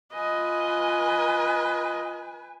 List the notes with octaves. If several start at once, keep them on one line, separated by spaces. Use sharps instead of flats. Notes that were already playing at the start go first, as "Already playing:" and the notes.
F4 B4 D#5 G#5